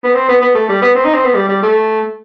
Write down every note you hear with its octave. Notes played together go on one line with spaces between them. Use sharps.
B3
C4
B3
B3
A3
G3
B3
C4
D#4
C4
B3
G3
G3
A3